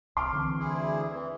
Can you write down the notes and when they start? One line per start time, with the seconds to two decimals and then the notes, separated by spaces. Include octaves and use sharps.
0.17 C2 C6 D6 F6
0.33 D3 E3 C4
0.59 D2 E4 G#4
1.10 E3